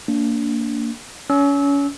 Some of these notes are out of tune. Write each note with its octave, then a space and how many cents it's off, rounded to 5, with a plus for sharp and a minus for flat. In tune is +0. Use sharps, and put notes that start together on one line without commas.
A#3 -15 D4 -25
C#4 +30 E6 -20